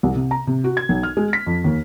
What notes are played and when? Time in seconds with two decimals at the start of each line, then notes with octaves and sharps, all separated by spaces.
0.03 C2
0.15 C3
0.31 A#5
0.47 C3
0.64 F#4
0.77 G#6
0.89 B1
1.03 F6
1.17 G#3
1.33 B6
1.47 F2
1.64 D#2